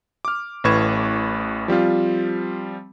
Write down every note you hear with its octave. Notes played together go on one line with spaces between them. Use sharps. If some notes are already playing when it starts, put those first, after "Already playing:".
D6 F6
A1 A2 B4 C#6 G#6 E7
F3 G3 C4 F4